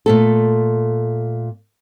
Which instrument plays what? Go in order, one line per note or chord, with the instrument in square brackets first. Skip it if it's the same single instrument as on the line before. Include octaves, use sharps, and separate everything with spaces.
[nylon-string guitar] A#2 A3 A4